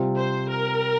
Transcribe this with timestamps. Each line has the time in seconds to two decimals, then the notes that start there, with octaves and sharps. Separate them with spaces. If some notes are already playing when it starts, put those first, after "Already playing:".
Already playing: C3 G3 C4 F4
0.18 C5
0.48 A#4